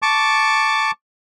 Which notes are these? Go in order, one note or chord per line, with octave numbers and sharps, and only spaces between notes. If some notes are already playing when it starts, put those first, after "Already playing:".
A5 C#6 D6